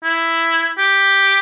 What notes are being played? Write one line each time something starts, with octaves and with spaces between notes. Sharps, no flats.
E4
G4